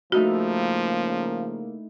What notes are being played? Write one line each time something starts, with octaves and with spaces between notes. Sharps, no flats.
C#3 F3 A3 A#3 D#4 E4 F#4